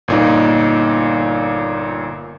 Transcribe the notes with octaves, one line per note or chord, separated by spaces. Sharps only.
G1 A#2 D#4